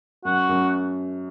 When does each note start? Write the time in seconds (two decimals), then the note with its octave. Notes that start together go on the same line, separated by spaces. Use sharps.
0.25 F#2 F#4
0.49 F#2